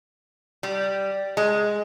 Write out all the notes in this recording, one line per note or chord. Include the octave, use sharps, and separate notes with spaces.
G3
G#3